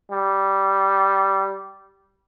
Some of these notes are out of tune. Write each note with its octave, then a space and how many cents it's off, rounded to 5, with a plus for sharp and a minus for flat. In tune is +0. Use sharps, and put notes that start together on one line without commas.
G3 -10